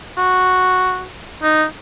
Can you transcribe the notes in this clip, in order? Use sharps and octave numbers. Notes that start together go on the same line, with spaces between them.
F#4
D#4